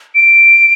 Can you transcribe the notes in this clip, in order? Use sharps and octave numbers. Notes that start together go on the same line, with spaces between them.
D7